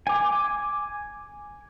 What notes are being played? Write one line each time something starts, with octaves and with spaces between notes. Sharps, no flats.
G#5 D6